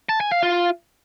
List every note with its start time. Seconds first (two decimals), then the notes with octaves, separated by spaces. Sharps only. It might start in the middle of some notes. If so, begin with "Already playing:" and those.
0.09 A5
0.20 G#5
0.32 F5
0.43 F4